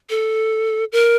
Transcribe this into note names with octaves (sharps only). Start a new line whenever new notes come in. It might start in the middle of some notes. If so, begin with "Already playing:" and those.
A4
A#4